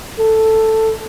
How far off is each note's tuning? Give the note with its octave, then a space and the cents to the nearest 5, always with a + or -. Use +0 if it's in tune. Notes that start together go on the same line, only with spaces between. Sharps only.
A4 +5